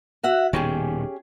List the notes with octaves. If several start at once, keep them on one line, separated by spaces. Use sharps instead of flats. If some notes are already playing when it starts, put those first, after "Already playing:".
F#4 E5 F#5
D#1 B2 D#3 C#4 G4 G#4